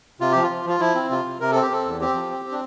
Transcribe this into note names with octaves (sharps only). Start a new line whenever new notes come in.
C3 F4
F3 G4
F4
F3
F3 F4
F3 E4
C4
C3 F4
C3
C3 A#4
C4 A4
G4
C4 A4
E2
C4 G4
F3
C4
C4
D4